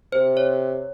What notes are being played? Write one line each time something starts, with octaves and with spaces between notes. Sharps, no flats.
C3 C5
C#5